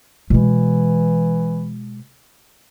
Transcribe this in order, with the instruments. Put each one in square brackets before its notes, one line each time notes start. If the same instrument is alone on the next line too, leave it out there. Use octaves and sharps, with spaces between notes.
[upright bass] B2 G#3 [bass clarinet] E3